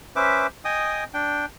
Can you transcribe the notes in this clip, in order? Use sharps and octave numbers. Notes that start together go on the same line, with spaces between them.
C#4 B4 C5 E5 D6
D#5 G5 G#5 D#6
D4 G5